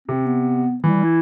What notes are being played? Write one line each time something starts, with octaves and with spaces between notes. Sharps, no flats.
C3 C4
B3
E3 G3
E4